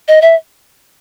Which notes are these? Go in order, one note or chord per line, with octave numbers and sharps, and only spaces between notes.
D#5
E5